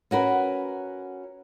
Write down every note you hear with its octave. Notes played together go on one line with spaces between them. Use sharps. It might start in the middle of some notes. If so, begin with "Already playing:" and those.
C#4 F#4 A#4 B4